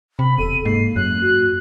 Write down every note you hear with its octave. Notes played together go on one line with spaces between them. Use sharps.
C3 B5
E1 A4 D#7
G#2 A#3 C7
F#2 F#6
F#4